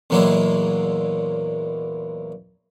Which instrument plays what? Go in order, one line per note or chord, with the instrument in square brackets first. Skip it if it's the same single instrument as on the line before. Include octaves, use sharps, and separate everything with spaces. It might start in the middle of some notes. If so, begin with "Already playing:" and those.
[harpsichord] E2 A#2 F#3 G#3 A#3 E4